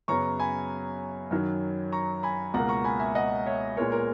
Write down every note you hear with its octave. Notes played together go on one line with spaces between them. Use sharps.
F#2 C#3 F#3 B3 A#5 C#6
G#5 B5
F#2 D#3 F#3
A#5 C#6
G#5 B5
C#2 B2 A#3 F#5 A#5
A#5 C#6
G#5 B5
E5 G#5
D#5 F#5
C#5 E5
A#2 G#3 B3 A#4 C#5
A#4